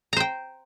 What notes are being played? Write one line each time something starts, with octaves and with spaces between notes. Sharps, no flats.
C5 G5 A#5